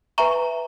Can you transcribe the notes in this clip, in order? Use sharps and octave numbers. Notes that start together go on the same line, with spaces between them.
B4 E5 G#5 A#5 C#6